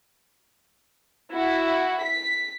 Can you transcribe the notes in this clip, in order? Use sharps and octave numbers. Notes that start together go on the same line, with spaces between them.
E4 F#4
B6